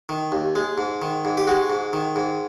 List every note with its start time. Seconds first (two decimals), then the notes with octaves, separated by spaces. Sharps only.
0.09 D#3
0.32 D#2
0.55 G#3
0.78 G#2
1.02 D#3
1.25 G#2
1.37 G4
1.47 G#3 F#4
1.70 G#2
1.93 D#3
2.16 G#2